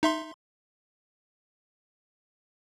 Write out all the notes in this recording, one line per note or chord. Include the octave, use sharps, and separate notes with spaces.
D#4 E5 C6